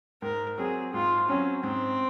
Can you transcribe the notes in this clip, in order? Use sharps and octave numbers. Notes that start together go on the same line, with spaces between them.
G#2 A#4
F#3 C4 G#4
G#2 F4
F#3 C4 C#4
G#2 C4